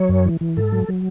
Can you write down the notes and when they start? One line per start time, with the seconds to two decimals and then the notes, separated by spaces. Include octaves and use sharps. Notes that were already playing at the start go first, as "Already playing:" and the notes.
Already playing: F#3 C#5
0.09 F#2
0.25 E3
0.41 E3
0.57 G#2 A4
0.72 F#3
0.89 F#3